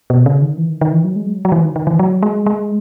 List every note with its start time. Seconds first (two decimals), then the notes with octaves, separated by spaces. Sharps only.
0.10 B2
0.26 C#3
0.42 D#3
0.57 E3
0.69 D#3
0.81 D#3
0.92 E3
1.04 F#3
1.16 G#3
1.26 F#3
1.45 F#3
1.52 E3
1.63 D#3
1.76 D#3
1.87 E3
1.99 F#3
2.23 G#3
2.46 G#3